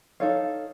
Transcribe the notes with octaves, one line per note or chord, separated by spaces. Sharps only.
D#4 A4 C#5 F5